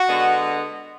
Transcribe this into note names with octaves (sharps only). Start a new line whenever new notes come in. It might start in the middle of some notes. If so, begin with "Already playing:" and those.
Already playing: F#4
D3 G#3 B3